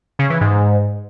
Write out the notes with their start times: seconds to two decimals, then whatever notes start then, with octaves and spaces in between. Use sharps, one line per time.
0.19 C#3
0.30 E3
0.41 G#2